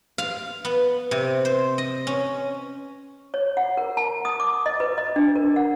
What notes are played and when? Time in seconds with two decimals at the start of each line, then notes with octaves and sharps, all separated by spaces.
0.18 F5
0.65 B3
1.11 C3
1.45 C5
1.78 D#5
2.07 C#4
3.34 C#5
3.57 F#5
3.77 A#4
3.97 A5
4.25 D#6
4.40 D6
4.66 D#5
4.80 B4
4.98 D#5
5.16 D4
5.36 A#4
5.56 F#5